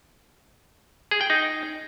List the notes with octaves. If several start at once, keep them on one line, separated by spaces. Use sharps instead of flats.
G#4
G5
D#4